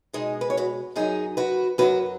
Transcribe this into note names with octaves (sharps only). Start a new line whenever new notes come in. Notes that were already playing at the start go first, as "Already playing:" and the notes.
B2 G#3 D#4 G#4
B4
C#5
F#4 B4
F#2 F#3 D#4 G#4
F#4 B4
F#2 F#3 F#4 B4